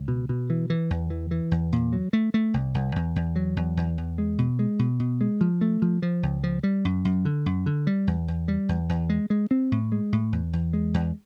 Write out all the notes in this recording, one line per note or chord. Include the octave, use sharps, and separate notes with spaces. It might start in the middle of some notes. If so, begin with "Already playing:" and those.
Already playing: C#2
B2
B2
E3
E3
E2
E3
E3
E2
A#2
F#3
A3
A3
C2
C2
E2
E2
F#3
E2
E2
E2
G#3
B2
G#3
B2
B2
G#3
F3
A3
F3
F3
C#2
F3
G3
F#2
F#2
D3
F#2
D3
G3
E2
E2
G3
E2
E2
G#3
G#3
C4
A2
G#3
A2
E2
E2
G#3
E2